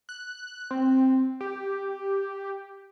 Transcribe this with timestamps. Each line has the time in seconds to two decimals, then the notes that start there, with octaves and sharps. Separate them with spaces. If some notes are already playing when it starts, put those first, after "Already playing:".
0.09 F#6
0.71 C4
1.41 G4